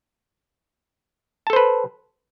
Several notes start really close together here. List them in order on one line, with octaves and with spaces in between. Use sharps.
A5 A4 C5 B4